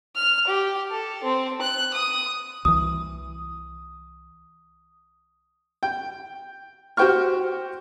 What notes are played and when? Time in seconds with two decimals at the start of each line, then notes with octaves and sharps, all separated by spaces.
0.16 F6
0.47 G4
0.91 A4
1.23 C4
1.62 F#6
1.94 D#6
2.65 C2 E3 D#6
5.83 G5
6.97 F#4 G4 C5 G5 C#6 F6